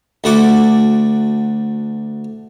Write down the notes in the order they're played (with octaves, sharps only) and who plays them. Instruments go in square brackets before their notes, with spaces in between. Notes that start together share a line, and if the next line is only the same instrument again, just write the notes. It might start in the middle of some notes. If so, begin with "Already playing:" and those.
[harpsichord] D2 A3 F#4 D6